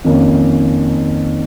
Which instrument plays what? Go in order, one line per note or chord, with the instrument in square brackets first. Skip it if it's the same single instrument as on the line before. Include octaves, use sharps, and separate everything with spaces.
[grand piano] F2 D#3 A#3 C#4